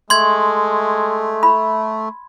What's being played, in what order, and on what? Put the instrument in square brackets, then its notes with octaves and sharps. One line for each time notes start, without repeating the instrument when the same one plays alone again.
[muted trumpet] G#3 [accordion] A3 [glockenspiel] C6 G#6
[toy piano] B5